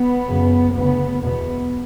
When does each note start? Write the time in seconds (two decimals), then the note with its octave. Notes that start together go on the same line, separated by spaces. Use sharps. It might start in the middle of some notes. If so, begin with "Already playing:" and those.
Already playing: B3
0.28 F#2 C#3
0.74 D2 B3
0.79 C#3
1.21 E2 B2 B3